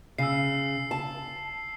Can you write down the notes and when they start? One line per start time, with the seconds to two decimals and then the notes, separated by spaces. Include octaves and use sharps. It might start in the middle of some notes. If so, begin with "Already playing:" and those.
0.18 C#3 E6 C7
0.91 A5